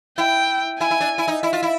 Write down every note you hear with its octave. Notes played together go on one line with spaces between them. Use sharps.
E4 G5
E4 G#5
E4
D4
E4
D#4
E4 E5
F4
E4